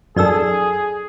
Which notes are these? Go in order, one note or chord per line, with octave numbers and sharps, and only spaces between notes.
F#2 D#4 G#4 A4 D5 E6